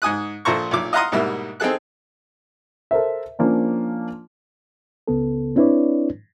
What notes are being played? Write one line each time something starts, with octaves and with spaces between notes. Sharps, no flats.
G#2 G#5 D#6 F#6
A#1 A#2 A4 C5 A#5 C#6
B1 A#2 D6
D#5 F5 F#5 A#5 C6 D#6
G#2 B2 G3 A#3 E4
C4 D#4 G#4 A4 F#6
A4 A#4 C5 E5
F3 A#3 C#4 D4
C#2 C#3 B3 A4
C4 D4 E4 B4 C#5 D5